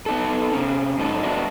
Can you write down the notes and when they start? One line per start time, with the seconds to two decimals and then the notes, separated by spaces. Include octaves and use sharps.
0.06 B3 D#4 A4
0.53 C3 C#4
0.98 G#2 F#3 D#4 A4
1.23 G2 B3 D4 F#4 D#5 E5